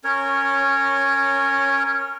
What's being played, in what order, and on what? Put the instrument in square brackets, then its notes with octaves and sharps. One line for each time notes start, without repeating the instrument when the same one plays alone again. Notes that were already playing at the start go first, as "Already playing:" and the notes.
[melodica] C#4 A#4 C#5